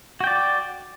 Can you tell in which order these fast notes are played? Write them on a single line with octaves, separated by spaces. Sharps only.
F#4 G5 D5